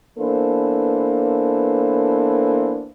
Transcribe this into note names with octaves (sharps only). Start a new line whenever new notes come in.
E3 A#3 B3 D4 A4 C5